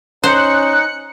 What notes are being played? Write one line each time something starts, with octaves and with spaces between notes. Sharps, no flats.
C#4 D#4 C5 F#6 C#7